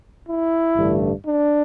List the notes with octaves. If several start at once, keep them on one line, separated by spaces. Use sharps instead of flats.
E4
A1 G2 D3 A3
D4